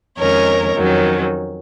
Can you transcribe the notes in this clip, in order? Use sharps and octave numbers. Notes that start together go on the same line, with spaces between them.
F2 D#3 G#3 C#4 A#4 C#5
F2 D#3 F#3 C#4